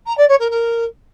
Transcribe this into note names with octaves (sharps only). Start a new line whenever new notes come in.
A#5
D5
C#5
A#4
A#4